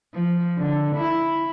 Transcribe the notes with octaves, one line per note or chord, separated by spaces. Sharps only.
F3
D3
E4